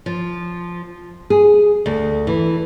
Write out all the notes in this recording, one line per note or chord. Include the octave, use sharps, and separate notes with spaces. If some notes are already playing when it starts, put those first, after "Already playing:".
F3
G#4
D2
E3